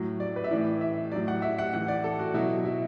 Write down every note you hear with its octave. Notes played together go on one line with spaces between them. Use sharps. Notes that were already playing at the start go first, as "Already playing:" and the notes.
Already playing: A2 F#3
D5
B4
E5
A2 E3 D5
E5
A2 F#3 D5
F#5
E5
F#5
A2 E3 F#5
D5
A4
F#4
B2 F#3 E4
E4